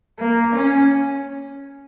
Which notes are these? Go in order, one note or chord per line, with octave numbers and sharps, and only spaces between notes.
A#3
C#4